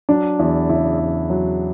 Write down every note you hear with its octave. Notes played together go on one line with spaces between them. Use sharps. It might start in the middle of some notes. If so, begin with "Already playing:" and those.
F#3 D4
E2 E4
C#3 E4
E2
F#3